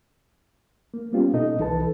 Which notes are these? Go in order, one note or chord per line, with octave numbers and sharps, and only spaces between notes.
A#3
G3 A#3 B3 C#4 F4 G4
B2 D#4 A4 D#5
C2 E3 D#4 A4 B4 A5